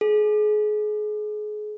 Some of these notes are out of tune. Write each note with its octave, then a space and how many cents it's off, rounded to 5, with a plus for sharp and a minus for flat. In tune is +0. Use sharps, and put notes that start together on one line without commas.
G#4 +30